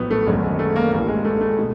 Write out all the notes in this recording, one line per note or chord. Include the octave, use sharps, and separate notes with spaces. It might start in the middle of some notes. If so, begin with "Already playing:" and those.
Already playing: A#1 A2 F#3 B3
A3
G#1 F#2 D3 G#3
G#3
A3
A#3
A1 G2 E3 A#3
G#3
A3
A3
B2